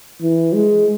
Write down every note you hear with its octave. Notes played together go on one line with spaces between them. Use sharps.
E3
G#3